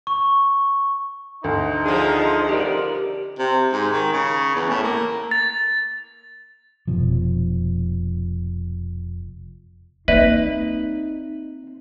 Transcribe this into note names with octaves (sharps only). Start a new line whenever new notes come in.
C#6
D2 D#4
D3 F3 G#4
G4 A#4 D5
C3
G#2
D#3
C#3
E2
A2
A#3
A6
F1 B2 F3
A#3 C4 D#4 B4 D5 E5